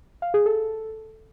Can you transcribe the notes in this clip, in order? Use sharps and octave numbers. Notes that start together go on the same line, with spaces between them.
F5
G#4
A4